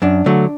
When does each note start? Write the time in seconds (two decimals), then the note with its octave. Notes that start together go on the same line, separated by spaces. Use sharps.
0.02 F#2 D4
0.26 D3 F#3 A3